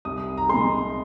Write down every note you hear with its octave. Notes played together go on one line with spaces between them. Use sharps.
C2 D#6
A#5
A#2 G#3 C6